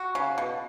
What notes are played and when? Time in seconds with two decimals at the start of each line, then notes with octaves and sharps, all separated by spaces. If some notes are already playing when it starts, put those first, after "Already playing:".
Already playing: F#4
0.15 C#3
0.38 B2